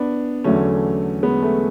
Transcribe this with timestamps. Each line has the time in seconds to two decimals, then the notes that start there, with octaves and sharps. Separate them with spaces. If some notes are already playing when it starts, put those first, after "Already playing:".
Already playing: B3 D4
0.44 E2 D3 F#3 A3 C#4
1.23 G#3 B3
1.43 A3